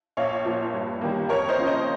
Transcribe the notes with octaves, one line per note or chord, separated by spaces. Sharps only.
A#1 C#5 F5
A#2 F3 A#3
G2
D#3 G3 A#3
F2 A#4 C#5
C5 D#5
C#3 F3
C5 D#5